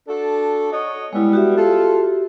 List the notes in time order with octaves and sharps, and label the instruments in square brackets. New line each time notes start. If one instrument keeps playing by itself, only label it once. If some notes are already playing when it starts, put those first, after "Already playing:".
[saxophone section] D4 F#4 A4
F#4 C#5 D#5
[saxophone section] G3 B3 [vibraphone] G#3 E4
[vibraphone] F#4 G4 E5
[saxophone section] F4 A4